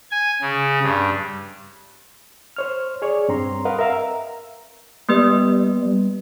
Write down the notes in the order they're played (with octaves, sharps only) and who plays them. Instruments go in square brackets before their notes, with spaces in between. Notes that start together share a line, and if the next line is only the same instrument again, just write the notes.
[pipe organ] G#5
C#3
G2
[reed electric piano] C5 C#5 F6
G#4 C#5 D5
G2 C4 A#5 C6
A#4 B4 D#5 F5 F#5
A#4 E5 F5 A#5 E6
[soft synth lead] G3 [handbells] A#3 B3 B4